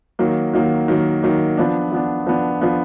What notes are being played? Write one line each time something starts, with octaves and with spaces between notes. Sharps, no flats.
D#3 F#3 A#3
D#3 F#3 A#3
D#3 F#3 A#3
D#3 F#3 A#3
F3 B3 D4
F3 B3 D4
F3 B3 D4
F3 B3 D4